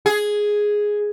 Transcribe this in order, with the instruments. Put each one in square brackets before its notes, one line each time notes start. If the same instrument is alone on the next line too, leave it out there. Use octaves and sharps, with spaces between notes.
[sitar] G#4